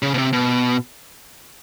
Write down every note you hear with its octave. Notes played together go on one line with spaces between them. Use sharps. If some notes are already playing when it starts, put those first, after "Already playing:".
C#3
B2
C3
B2